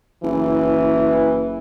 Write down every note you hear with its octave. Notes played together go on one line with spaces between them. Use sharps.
F#1 E3